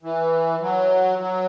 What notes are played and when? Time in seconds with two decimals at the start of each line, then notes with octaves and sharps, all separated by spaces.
0.03 E3
0.62 F#3
1.20 F#3